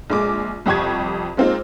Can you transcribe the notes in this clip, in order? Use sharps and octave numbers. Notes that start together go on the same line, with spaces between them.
A#1 G#3 D6
C2 F2 G4 C#6 G#6
G#3 A#3 C4 D#4 F4